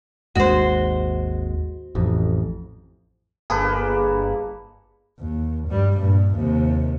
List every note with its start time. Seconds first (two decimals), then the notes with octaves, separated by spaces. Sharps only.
0.35 G#1 D#2 G#3 F#4 C5
1.95 A1 F2
3.50 G1 A#3 G#4 A4 B4
5.19 D#2
5.68 G2 G3
5.99 G2 A#2
6.35 D#2 C3